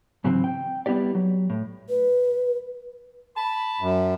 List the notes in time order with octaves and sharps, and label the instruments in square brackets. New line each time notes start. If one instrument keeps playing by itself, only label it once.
[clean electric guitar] G#2 C#3 E3 F#3 C4
G5
G3 B3 E4 G4 D5
F#3
A2
[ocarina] B4
[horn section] A5 B5
[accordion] F#2